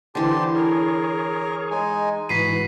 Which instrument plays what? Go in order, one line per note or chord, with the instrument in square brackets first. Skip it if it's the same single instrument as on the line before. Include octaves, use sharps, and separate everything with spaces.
[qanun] D3 E3 [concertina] G4 A5 C6 [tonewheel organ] C5
[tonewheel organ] G#4 C#5 [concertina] A#4
[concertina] G#3 D#4 G#5
[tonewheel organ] G#2 E3 [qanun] F#4 [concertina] B5 [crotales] B6 C7 D#7